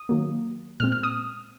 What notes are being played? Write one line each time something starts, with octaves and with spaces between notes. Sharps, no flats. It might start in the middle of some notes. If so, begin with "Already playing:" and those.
Already playing: D#6
D#3 F#3 A#3
A#2 G#3 C4 F6
F6
D#6